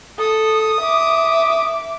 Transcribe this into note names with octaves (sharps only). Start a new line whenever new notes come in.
A4 D#6
E5 D6